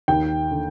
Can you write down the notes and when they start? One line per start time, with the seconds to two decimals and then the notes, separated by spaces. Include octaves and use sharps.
0.08 D#2 G5
0.51 D3